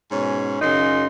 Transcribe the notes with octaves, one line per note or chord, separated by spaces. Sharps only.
G#2 B2 C#4
F#2 C#3 D#4 C6